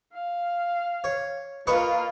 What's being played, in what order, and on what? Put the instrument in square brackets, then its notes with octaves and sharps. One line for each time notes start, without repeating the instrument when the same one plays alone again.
[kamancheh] F5
[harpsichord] C#5
[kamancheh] A#3 F4 [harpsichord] B4 D#5 C#6